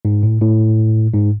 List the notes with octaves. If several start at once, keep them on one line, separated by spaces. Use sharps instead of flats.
G#2
A2
A2
G#2